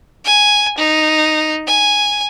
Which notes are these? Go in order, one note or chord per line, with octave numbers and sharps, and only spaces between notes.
G#5
D#4
G#5